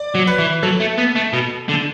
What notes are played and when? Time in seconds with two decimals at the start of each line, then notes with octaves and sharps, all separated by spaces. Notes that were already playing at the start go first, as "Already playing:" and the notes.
Already playing: D5
0.15 F#3
0.27 B4
0.39 E3
0.63 F#3 A4
0.80 A3
0.98 B3
1.15 A3
1.33 B2
1.69 D3